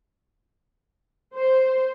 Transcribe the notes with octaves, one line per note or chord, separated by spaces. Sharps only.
C5